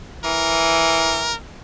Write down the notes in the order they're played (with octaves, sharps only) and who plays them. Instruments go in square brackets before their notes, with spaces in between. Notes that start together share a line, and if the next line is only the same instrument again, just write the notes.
[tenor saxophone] E3 [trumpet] A#4